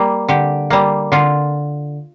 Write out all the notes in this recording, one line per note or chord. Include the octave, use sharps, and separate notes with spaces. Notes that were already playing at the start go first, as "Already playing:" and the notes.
Already playing: G3 A#3
D3 G4
G3 A#3
D3 F4